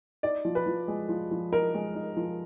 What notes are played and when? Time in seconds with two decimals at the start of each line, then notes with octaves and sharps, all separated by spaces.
0.23 D#4 D5
0.45 F3
0.55 B4
0.66 F3
0.88 G#3
1.09 F3
1.31 F3
1.52 D#4 A#4
1.75 G#3
1.95 D#4
2.17 F3